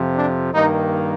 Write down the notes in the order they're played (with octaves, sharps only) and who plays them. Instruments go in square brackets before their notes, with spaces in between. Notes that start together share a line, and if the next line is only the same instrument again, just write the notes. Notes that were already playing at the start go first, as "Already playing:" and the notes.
Already playing: [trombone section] F2 C3 F3
D4
G2 D#3 A#3 D#4